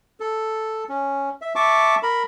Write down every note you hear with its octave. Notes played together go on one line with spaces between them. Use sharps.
A4
C#4
E5
E5 A5 C#6 D6
A#4 B5